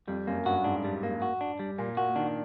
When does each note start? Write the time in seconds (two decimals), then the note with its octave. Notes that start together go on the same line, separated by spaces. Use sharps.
0.08 F2 G3
0.27 F#2 A#3
0.45 G2 F#4
0.64 G#2 D4
0.84 G3
1.03 A#3
1.22 F#4
1.41 D4
1.59 G3
1.78 A#2 A#3
1.97 A#2 F#4
2.16 D#3 D4